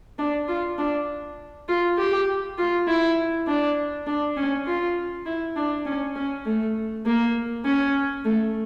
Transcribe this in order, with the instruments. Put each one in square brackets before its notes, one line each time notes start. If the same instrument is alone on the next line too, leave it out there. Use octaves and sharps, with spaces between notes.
[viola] D4
F4
D4
F4
G4
F4
E4
D4
D4
C#4
F4
E4
D4
C#4
C#4
A3
A#3
C#4
A3